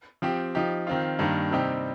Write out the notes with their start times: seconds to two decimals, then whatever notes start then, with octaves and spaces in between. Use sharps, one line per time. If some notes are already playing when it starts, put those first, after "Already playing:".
0.22 F3 C4 G4
0.55 F3 D#4 G4
0.87 D#3 C4 F4
1.19 G2 D#3 A#3
1.51 C3 G3 C4 D#4 G4